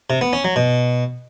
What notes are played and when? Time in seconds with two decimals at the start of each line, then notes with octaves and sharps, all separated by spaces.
0.10 C3
0.21 B3
0.33 C#4
0.44 F#3
0.56 B2